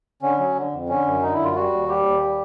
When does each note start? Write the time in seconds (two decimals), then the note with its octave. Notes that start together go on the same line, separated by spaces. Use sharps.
0.22 D3 C#4
0.39 F#3
0.55 D3
0.72 F2
0.89 D3 C#4
1.06 F#2
1.22 D3 D#4
1.33 E4
1.39 F#2 F4
1.55 G3 F#4
1.72 D#2
1.88 G3 G4
2.06 D#2
2.23 G3